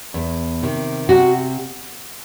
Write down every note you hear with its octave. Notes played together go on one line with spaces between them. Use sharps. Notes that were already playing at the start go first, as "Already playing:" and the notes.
E2
C3 D#3
C3 F#4